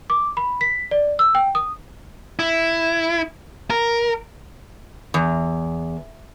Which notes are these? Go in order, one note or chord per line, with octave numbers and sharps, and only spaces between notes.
D6
B5
B6
D5
E6
G5
D#6
E4
A#4
E2